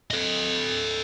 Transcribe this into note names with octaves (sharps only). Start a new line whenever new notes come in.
A4 D#5